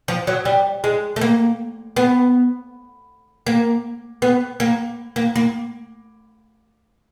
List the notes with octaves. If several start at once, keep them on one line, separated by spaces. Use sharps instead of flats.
F3
F#3
G3
G#3
A3
A#3
B3
A#3
B3
A#3
A#3
A#3